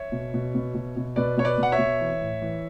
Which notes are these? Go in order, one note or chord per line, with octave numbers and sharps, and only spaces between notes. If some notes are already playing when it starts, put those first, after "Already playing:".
Already playing: C#5 E5
B2
B2
B2
B2
B2
B2 B4 D5
B2 C#5
B4 D5
B2 F#5
C#5 E5
B2
E3
A2
E3